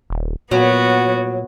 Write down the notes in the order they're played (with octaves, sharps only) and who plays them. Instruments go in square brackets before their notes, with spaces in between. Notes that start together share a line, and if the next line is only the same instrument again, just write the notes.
[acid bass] D#1
[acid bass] A#2 [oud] F#3 [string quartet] B3 F#4